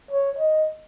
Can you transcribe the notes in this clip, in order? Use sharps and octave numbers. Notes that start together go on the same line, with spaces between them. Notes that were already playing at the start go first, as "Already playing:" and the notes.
C#5
D#5